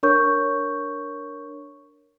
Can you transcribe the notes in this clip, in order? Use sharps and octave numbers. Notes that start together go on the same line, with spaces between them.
D4 A#4 C#5 C#6 G6